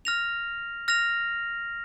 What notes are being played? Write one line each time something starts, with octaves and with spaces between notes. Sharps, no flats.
F6 A#6 F7
F6 A#6 F7